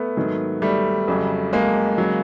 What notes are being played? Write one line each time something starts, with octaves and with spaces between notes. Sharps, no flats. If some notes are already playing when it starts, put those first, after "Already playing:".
Already playing: A3 B3
G#2 D#3 F#3
G3 A3
F2 C#3 F#3
G#3 A#3
C#3 F#3